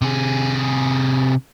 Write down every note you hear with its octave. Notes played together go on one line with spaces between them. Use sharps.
C3 G#4